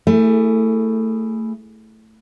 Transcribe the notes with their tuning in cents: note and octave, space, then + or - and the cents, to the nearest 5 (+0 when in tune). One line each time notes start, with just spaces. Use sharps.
A3 +20 E4 +0 G#4 +0